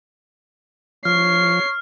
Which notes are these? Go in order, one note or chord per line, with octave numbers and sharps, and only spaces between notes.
F3 C#5 F6 C7